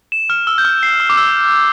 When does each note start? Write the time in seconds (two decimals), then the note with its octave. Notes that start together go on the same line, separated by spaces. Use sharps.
0.12 E7
0.30 F6
0.47 E6
0.58 G6
0.65 F6
0.83 C7
1.00 E6
1.09 D6
1.17 E6